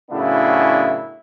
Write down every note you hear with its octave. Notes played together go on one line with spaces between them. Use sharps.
F#2 A2 C#3 B3 D4 E4